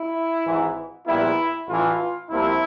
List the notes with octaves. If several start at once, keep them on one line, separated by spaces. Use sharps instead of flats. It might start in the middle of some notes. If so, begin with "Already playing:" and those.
Already playing: E4
G#1 G#2 E3
A#1 A#2 G3 B3 E4
A1 A2 E3 F4
C2 C3 F3 A#3 E4